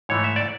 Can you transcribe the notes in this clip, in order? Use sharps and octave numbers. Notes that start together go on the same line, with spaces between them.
G#2 E3 A3 C#5
E5
D5